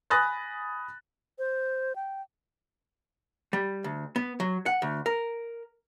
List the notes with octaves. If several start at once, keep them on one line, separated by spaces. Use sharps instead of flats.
G#5 B5 D#6 F#6 A6 A#6
C5
G5
G3
D2
B3
F#3
F#5
D2
A#4